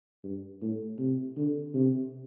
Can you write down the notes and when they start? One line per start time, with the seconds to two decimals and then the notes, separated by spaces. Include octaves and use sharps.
0.24 G2
0.61 A2
0.99 C3
1.37 D3
1.74 C3